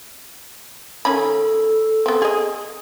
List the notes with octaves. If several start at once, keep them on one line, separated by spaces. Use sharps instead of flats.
D#3 C#4 A4 B5
B3 C4
G#4 D#5